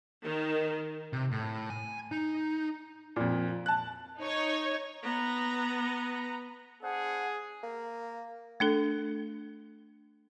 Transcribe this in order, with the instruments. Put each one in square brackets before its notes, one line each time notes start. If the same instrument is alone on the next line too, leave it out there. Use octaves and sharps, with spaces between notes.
[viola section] D#3
[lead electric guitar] C3
A2
G#5
D#4
[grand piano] F2 A#2
A5 F#6
[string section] D#4 C#5
[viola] B3 A#5
[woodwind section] D4 C5 F#5 [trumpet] G#4
[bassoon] A#3
[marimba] A3 D4 A4